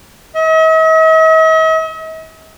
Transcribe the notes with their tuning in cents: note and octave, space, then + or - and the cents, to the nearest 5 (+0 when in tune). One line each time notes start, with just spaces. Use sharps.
D#5 +45